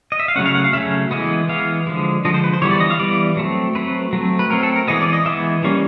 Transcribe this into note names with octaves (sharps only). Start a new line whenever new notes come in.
D#5
E5
F5
C#3 F#3 A3 C#4 F#5
F5
F#5
F5
C#3 F#3 A3 C#4 E5
E3 G#3 B3 D#5
E3 G#3 B3 F5
D3 F3 G#3
D3 F3 G#3 D#5
C5
B4
C5
E3 G3 B3 C#5
D5
D#5
F5
E3 G3 B3 D5
F#3 A3 C4
F#3 A3 C4 B4
F#3 A3 C4
B4
F#3 A3 C4 A#4
A4
A#4
E3 G#3 B3 D#5
D5
D#5
E3 G#3 B3 E5
E3 G3 A#3 C#4